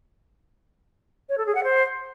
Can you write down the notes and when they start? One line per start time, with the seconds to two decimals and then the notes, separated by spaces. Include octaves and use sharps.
1.29 C#5
1.38 A4
1.46 G#4
1.55 F#5
1.64 C5